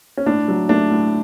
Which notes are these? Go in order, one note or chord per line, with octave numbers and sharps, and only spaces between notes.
C#4
A2 D4
F#3
A3 D4
A2